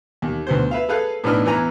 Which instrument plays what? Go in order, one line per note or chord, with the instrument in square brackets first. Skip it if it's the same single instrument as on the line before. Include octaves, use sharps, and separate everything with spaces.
[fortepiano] D#2
D2 B3 C5
B4 E5 F5
G#4 A4 B4 F5 F#6
A2 E3 B3 D4 D#4 F6
E2 E3 G#5 A#5